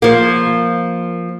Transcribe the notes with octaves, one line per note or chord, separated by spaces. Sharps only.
F3 A#3